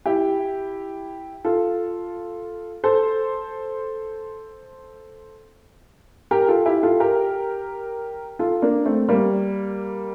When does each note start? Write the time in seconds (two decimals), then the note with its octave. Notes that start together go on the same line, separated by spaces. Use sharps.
0.06 E4 G4
1.45 F4 A4
2.84 A4 C5
6.31 G4 A#4
6.48 F4 A4
6.66 E4 G4
6.83 F4 A4
7.00 G4 A#4
8.39 F4 A4
8.62 A#3 D4
8.85 A3 C4
9.09 G3 A#3